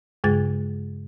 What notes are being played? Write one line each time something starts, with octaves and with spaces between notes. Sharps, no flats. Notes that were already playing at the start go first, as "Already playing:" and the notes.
G2 C#3 G#3 G#4 A6